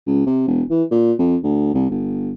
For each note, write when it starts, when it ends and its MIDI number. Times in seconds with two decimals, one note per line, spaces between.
0.07 0.27 37
0.27 0.45 48
0.48 0.62 28
0.70 0.83 52
0.91 1.13 46
1.19 1.37 41
1.43 1.73 38
1.74 1.88 36
1.90 2.33 31